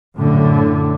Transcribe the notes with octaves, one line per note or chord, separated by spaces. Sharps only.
F#2 A2 D3